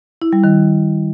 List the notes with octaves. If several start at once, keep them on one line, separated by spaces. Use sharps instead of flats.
E4
G3
D#3